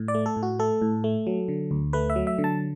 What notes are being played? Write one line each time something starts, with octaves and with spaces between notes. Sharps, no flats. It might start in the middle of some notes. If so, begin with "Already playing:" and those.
Already playing: A2
D5
A3
A4
A2
F#4
A3 A4
A2
A3
F#3
D3
D2
A3 B4
E5
F#3
E5
D3
A5